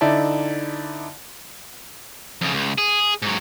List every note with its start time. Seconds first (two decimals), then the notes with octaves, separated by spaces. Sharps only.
0.01 D3 D#4 E4 D5 E5 A5
2.41 F2 C#3
2.54 C#2
2.78 G#4
3.22 G#2 F#3